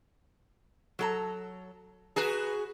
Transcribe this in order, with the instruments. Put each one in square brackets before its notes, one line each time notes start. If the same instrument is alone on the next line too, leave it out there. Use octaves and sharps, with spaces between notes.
[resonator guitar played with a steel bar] F#3 A4 A#5
[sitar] F#4 G#4 [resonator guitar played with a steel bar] B4 A#5